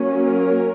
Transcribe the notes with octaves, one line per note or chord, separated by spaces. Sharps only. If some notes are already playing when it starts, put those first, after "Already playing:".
Already playing: F#3 A#3 C#4
A#4